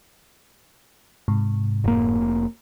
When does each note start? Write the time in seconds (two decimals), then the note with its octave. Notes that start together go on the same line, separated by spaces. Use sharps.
1.28 G#2 C3
1.84 F1 A#3